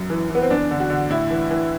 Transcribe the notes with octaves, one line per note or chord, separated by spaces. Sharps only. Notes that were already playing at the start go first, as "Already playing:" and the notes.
Already playing: F#2
E3
E3 B3
C4
E2 D4
D3
F#4
D3
A2 E4
E3
E3